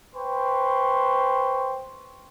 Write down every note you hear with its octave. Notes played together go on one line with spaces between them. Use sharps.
B4 C5 G5 C6 C#6